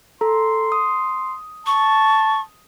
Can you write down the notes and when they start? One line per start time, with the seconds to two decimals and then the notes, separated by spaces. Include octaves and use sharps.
0.21 A4 A#5 C6
0.72 D#6
1.66 A5 C#6